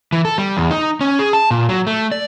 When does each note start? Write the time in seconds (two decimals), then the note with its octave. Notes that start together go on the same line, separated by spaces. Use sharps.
0.12 E3
0.25 A4
0.38 G3
0.57 E2
0.71 D#4
1.01 C#4
1.19 G#4
1.33 A5
1.51 A#2
1.69 F#3
1.87 A3
2.12 D5